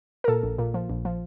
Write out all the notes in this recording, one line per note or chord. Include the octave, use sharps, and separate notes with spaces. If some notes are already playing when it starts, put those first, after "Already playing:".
A#4
A#2 A4
A#1
A#2
F3
A#1
F3